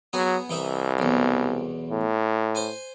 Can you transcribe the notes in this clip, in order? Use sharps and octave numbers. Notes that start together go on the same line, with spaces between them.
F#3 B3 G#4
C2 E3 D#4 E5
B1 E2
A2
C5 G#5